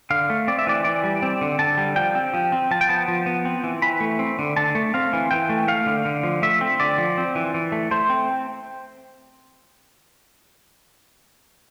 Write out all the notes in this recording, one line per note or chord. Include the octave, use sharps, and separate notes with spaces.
D3 F5
A3
C4 D5
E5
E3 D5
E3 D5
G3
C4
D3
D3 A5
G3
F3 G5
C4
F3
C4
F3 A5
G5
B3 A5
F3
B3
C4
E3
E3 B5
A3
C4
D3
D3 A5
A3
C4 F5
E3
E3 G5
A3
A3 F5
D3
D3
F3
A3 E5
C4
D3 D5
F3
C4
E3
E3
A3
A3 C5
C4